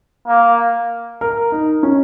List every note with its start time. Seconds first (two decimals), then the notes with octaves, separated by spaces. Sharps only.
0.27 A#3
1.21 A#4
1.52 D#4
1.83 C#4